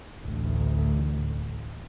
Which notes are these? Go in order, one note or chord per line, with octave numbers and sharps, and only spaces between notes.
A1 D2